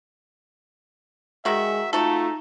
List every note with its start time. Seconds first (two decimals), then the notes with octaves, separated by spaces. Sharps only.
1.45 D#3 G#3 F#4 E5
1.93 A3 D#4 F4 F#4 A4